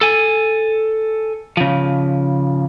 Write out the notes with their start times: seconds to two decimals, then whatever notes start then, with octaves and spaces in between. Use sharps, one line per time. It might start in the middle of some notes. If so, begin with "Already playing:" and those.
0.01 A4 G#5
1.57 C#3 F3